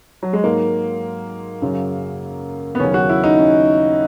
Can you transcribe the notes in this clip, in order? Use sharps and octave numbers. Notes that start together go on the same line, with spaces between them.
F#3
G#3
G#2 F#3 A#3
F#2 C#3 F#3
B3
D#2 C#3 F#3 C#4
F#4
E4
D#4
C#4